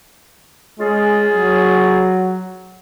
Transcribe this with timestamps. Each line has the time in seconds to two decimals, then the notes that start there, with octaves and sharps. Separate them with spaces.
0.79 G#3 C#4 F4 G#4
1.35 F#3